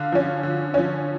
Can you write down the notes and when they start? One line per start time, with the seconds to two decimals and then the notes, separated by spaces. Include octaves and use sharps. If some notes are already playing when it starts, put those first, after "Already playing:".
Already playing: D3 F5
0.12 F3 C#4
0.43 D3
0.74 F3 C#4